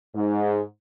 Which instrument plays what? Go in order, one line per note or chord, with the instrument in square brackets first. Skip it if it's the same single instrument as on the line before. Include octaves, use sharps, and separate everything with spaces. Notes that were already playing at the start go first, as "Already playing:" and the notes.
[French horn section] G#2